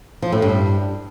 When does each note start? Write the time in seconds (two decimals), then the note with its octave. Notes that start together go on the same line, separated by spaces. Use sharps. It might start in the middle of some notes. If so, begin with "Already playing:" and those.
0.22 F3
0.32 A2
0.42 G2